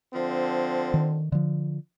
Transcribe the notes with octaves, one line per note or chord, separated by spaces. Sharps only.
D3 F3 C4
D#3
D3 F3